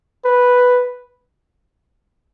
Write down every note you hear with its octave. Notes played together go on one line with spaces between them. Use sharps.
B4